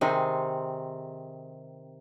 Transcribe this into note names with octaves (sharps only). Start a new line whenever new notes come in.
C3 D#3 C4 G#4